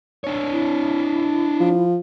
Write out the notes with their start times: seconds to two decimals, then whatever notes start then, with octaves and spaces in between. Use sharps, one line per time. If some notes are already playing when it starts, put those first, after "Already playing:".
0.24 D4 C#5
0.51 E4
1.60 F3